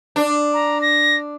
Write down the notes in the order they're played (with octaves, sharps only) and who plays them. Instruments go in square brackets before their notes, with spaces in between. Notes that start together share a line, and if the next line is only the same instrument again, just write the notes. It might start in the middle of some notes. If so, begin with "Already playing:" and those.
[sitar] D4
[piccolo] A#5
A#6